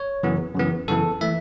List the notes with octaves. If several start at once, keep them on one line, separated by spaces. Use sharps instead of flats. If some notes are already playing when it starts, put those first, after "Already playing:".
Already playing: C#5
F#2 C#3 E3 B3
F#2 C#3 E3 B3
F#2 C#3 E3 B3 A4
E3 A3 E5